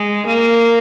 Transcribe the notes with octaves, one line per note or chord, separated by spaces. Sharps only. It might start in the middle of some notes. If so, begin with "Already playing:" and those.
Already playing: G#3
A#3